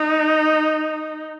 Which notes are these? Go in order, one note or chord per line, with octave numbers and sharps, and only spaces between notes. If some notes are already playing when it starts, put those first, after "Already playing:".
Already playing: D#4